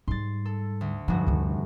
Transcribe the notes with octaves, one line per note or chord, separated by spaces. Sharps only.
G#2 G3 C6 A6
A4
D2
F1 G2 F3 F#4
D2 D#3